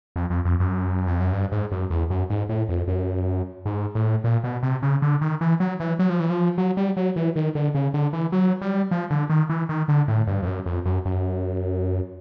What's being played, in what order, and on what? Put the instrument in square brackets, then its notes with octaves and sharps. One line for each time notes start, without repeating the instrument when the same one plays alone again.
[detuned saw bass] F2
F2
F2
F#2
F2
F#2
G2
G#2
F#2
E2
F#2
G#2
A2
F2
F#2
G#2
A2
A#2
B2
C3
C#3
D3
D#3
E3
F#3
E3
F#3
F3
E3
F3
F#3
G3
F#3
E3
D#3
D3
C#3
D3
E3
F#3
G3
F3
D3
D#3
E3
D#3
D3
A2
G2
F2
F#2
F2
F#2
F#2